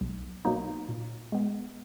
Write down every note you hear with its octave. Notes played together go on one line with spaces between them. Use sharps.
B1
B2 F#3 A#3 D#4
A#2
G#3 B3